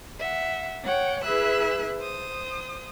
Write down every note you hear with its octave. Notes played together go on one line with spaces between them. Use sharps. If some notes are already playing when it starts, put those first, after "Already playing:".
E5 F#5
C#5 F#5 G5
E4 G#4 B4 E5 E6 F#6
C5 D#6